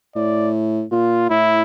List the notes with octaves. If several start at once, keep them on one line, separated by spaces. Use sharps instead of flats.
A2 D5
A#2 F4
A2 E4